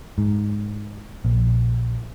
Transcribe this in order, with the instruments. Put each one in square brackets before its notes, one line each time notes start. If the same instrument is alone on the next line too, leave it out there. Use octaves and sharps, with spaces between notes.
[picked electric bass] G#2
A#1